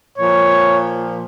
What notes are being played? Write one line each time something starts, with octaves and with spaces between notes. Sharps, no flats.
A#2 F3 C#5